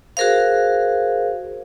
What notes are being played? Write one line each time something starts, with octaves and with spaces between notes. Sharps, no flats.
F#4 G#4 A#4 C5 F5